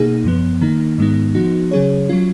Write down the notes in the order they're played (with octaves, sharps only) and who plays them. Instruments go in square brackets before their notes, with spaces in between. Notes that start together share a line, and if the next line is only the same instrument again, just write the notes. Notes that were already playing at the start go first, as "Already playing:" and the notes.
Already playing: [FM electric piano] B2 A#3 D#4 G#4
F#2 F3 B3
D#3 A#3 D#4
G#2 D#3 G#3 B3 D#4
F3 B3 D#4 F#4
C#3 F#3 C#4 G#4 C#5
F#3 C#4 F4